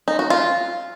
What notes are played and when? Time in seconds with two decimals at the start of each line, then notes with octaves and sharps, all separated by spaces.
0.08 D#4
0.19 F#4
0.30 F4